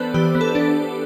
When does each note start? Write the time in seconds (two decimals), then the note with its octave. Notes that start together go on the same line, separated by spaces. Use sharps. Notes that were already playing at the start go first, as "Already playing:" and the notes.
Already playing: E3 B3 D4 A4 B4 C5 D5
0.14 E3 G4
0.35 B3
0.41 A4
0.55 D4